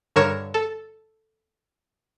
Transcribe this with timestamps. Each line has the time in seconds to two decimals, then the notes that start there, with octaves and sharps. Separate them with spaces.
0.16 G2 D3 A#4 C#5 E7
0.54 A4